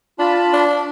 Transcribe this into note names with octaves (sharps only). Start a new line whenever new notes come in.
D4 F4 A5 B5
D4